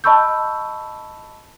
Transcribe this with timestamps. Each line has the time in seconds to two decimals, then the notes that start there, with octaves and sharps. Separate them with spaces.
0.04 D#5 A5 B5 C#6 E6 G6